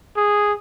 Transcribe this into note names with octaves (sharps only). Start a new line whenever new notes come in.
G#4